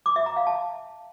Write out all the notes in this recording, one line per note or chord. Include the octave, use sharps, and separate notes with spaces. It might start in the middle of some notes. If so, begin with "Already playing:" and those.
D6
E5
A#5
F5
A5